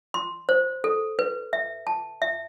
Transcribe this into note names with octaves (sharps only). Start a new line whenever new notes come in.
C6
C5
A4
B4
E5
A5
E5